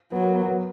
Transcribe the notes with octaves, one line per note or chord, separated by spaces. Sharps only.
F#3 B3
A#3
B3
B3